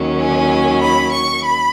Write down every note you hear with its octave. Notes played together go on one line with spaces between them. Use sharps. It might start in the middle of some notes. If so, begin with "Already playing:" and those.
Already playing: D#2 D#3 F#3 C#4
G#5
B5
C#6
B5